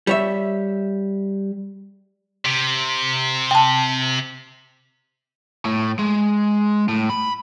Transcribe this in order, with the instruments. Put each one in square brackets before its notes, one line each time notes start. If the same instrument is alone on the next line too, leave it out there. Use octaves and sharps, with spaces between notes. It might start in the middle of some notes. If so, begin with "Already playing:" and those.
[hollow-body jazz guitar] G3 C#5 E5
[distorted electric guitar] C3
[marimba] G5 A5
[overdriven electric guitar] A2
G#3
A2
B5